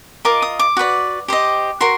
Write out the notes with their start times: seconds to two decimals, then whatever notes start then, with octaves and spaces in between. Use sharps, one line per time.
0.25 F4 A#4 D#5 D6
0.42 D#6
0.59 D6
0.77 F#4 B4 D5
1.28 G4 C5 D#5
1.81 F#4 A#4 C6